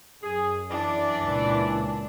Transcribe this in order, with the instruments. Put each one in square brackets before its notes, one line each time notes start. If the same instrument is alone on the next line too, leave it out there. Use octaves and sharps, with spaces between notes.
[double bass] F#2 [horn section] G#4
[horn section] E3 D5 [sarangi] D4
[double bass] C#2 A#2